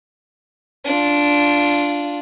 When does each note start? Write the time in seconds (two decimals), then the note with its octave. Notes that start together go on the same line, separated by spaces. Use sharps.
0.85 D4 F4